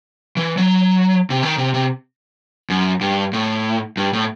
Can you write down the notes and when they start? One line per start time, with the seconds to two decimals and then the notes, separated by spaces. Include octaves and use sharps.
0.37 E3
0.58 F#3
1.30 C3
1.43 D#3
1.58 C3
1.74 C3
2.70 F#2
3.01 G2
3.33 A2
3.97 G2
4.13 A2